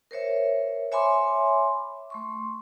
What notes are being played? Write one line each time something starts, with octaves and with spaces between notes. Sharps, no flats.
A#4 C5 C#5 E5
C#5 E5 G#5 B5 C6 D6
A3 C6 C#6